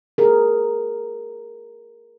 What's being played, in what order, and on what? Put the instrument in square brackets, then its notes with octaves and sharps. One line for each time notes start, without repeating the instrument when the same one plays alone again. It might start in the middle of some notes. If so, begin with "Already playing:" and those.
[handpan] G#4 A#4